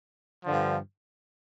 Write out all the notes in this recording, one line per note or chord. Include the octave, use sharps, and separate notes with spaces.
G2 D3 F3